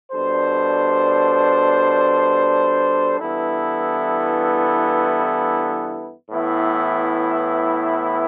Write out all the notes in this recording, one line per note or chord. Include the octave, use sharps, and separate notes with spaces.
B2 G3 D4 A4 C5
G2 E3 B3 E4 A4
A2 E3 B3 E4